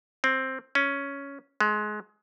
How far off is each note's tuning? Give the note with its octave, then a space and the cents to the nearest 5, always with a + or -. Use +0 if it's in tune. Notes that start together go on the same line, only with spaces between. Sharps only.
C4 +5
C#4 +5
G#3 +25